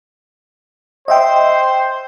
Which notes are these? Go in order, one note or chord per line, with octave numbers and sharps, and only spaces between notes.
C5 D#5 E5 G5